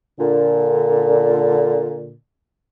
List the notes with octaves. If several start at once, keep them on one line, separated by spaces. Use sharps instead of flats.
A#2 D3